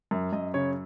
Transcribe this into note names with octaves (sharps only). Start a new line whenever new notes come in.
F#2
F#2 D#5
C#3 C#5